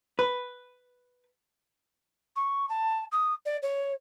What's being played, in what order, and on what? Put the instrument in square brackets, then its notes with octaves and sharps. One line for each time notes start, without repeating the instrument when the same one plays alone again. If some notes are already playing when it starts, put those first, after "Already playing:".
[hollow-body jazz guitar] B4
[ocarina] C#6
A5
D#6
D5
C#5